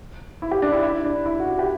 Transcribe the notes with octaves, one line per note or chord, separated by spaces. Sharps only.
E4
G4
D4
E4
E4
D4
E4
F#4
G4